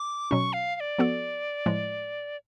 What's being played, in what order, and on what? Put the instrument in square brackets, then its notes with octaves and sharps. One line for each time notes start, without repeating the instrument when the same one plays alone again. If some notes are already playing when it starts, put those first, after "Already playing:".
Already playing: [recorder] D6
[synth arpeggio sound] B2 F#3 C#4 [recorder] C#6
[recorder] F5
F5
D5
[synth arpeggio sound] F3 B3 F#4 A4
A2 F3 G#3